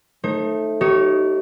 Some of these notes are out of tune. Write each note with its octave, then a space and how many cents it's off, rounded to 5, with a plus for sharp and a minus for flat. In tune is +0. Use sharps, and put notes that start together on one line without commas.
A3 +0 D#4 +0 C5 +45
D#4 +10 G4 -40 C#5 +0